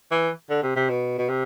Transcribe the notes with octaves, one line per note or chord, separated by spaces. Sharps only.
E3
D3
C3
C3
B2
B2
C3